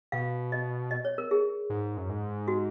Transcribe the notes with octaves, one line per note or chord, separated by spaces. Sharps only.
B2 F5
D#5
D#5
C#5
A#4
G#4
G#2
F#2
G#2
F#4